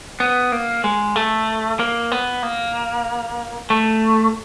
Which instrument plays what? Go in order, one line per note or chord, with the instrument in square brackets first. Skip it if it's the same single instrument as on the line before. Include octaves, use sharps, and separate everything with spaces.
[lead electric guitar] B3
A#3
G#3
A3
A#3
B3
A#3
A3